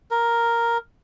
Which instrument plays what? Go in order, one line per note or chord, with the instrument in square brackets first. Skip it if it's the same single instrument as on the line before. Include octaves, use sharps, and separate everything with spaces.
[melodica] A#4